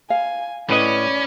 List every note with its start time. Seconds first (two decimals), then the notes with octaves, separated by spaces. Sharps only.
0.10 F5 G#5
0.70 A2 C#4 B4 D5 D#5 B5